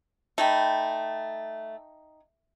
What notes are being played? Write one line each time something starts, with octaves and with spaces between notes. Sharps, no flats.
A3 D#4 G5 B5